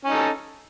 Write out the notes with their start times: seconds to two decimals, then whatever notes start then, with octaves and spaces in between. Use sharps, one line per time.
0.05 C#4
0.08 D#4
0.10 A4